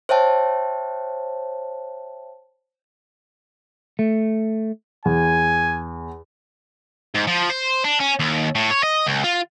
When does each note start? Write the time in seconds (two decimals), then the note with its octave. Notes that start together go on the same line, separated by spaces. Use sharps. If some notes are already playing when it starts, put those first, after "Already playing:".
0.09 C5 C#5 E5 G5 A5
3.99 A3
5.05 E2 G#5
7.14 G#2
7.27 F3
7.50 C5
7.84 D4
8.00 C#4
8.19 D#2
8.55 A2
8.71 C#5
8.83 D#5
9.06 C#2
9.24 F4